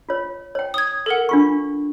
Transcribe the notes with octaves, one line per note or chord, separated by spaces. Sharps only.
F4 C#5
C#5 G5
D#6 G#6
A4 A#4 F#5
D4 F4 C#6